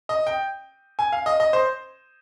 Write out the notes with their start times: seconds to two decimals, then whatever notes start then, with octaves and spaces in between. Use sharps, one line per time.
0.09 D#5
0.27 G5
0.99 G#5
1.12 F5
1.26 D#5
1.40 D#5
1.53 C5